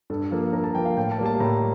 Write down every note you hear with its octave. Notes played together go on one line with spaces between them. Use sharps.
G2 A4
F3 A#3 A4
G2 A#4
A5
F3 A#3 G5
F5
A2 G5
A5
G3 A#3
A5
A2 A#5